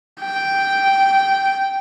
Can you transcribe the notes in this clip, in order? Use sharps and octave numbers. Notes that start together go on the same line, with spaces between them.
G5